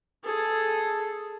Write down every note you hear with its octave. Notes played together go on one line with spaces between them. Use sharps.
G#4 A4